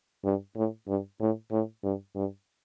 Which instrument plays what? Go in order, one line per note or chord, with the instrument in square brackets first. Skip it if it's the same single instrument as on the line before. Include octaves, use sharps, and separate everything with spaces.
[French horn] G2
A2
G2
A2
A2
G2
G2